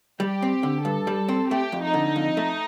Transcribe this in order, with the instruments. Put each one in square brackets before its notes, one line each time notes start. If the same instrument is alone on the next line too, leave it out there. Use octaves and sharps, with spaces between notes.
[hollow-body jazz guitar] G3 [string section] G4
[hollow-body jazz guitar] C4
D3
[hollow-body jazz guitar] G2 [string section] A4
[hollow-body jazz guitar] G3
C4
[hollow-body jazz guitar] A3 [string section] G4
[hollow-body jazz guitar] F2
[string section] D#4
[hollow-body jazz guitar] D3
F2
A3